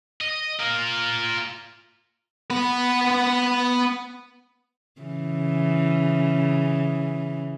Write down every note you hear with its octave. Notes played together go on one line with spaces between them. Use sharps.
D#5
F4 A#4
B3 B4
C#3 E3